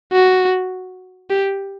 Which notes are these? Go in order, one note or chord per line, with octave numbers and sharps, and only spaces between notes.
F#4
G4